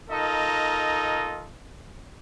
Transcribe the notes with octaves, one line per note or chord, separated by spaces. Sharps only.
D#4 F4 A4 A#4 D#5